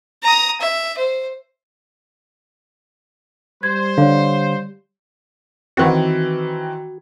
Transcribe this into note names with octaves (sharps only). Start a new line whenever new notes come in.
A#5 D#6
E5
C5
G3 C5 G#6
D3 C#5 F5
D#3 E3 C4 F#4